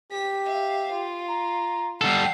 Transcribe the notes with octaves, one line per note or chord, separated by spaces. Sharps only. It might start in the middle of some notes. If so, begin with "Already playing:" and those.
G4 B6
E5 F5
F4
A#5
G3 A4 F#5 C7